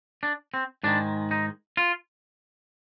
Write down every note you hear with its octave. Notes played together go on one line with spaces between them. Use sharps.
D4
C4
G#2 D#3 G#3 D4
D#4
F4